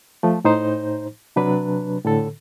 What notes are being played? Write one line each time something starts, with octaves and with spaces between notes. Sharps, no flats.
F3 A3
A2 D#4 C5
C3 F#3 D4 B4
A2 D3 A4